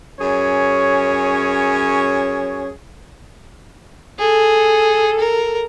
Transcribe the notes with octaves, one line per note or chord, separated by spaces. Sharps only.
F#2 C#4 G#4 C#5
G#4 A4
A#4